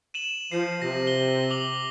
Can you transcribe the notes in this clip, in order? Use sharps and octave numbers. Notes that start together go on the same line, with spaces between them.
D#7 E7 F#7
F3 C7
C3 A#6
G7
D6 F#7 G7